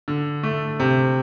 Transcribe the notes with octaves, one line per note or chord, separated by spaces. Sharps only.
D3
A3
C3